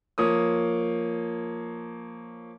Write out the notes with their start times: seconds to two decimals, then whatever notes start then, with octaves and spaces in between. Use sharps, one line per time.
0.18 F3 A#3 C#5 D#6